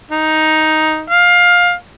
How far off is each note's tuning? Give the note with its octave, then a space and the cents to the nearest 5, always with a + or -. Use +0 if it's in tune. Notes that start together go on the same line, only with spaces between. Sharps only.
D#4 +5
F5 +20